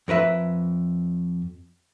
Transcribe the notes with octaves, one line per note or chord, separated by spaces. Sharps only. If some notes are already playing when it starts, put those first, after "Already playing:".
F2 A#4 B4 E5